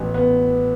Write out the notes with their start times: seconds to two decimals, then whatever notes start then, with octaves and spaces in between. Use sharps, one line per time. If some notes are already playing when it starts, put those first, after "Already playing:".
Already playing: A1 B3
0.14 B3